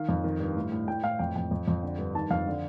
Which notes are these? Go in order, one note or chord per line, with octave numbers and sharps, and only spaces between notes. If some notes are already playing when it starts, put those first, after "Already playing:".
Already playing: D#3 F5
F2
D#3
G2
A2
A2
A2 G5
A2 F5
F2 G5
F2 G5
F2
F2
D3
G2
D#3 A5
F2 F5
D3